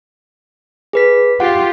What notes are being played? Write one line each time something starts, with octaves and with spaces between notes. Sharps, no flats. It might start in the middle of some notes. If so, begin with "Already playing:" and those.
G#4 B4 B6
F4 G4 F#5